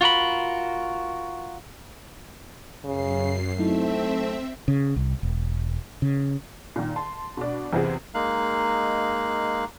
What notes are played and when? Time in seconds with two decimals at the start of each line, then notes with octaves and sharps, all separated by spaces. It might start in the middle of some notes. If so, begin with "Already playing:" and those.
0.01 F4 F#4 A#4 B5
2.84 F#2 C#3 C7
3.59 F#3 A3 C4 D#4 E4 E5
4.68 C#3
4.96 C2
5.23 E1
6.02 C#3
6.76 A#2 D#3
6.96 A5 C6
7.37 B2 D4
7.73 E2 C3 B3 C4 F4 G#4
8.14 G#3 A#3 D#4 F5 F#6